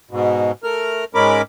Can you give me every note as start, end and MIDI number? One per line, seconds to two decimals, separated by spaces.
0.11 0.52 44
0.11 0.52 47
0.64 1.05 57
0.64 1.05 70
0.64 1.05 89
1.15 1.42 44
1.15 1.42 56
1.15 1.42 61
1.15 1.42 70
1.15 1.42 83
1.15 1.42 86